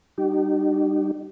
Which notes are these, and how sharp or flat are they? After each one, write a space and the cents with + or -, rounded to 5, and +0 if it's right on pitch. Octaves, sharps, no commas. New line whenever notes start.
G3 +0 D#4 -40 G4 -35